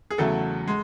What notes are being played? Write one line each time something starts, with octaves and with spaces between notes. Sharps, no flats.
G#4
E2 C#3 F#3 A3 A4
G#3